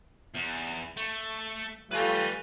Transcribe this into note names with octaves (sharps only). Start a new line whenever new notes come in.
E2
A3
G3 A3 F4 B4 G#5